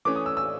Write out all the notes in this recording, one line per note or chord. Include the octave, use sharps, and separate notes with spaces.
E3 A3 C#4 D6
D#6
E6
E6